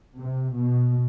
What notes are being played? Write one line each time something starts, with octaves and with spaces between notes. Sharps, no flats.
C3
B2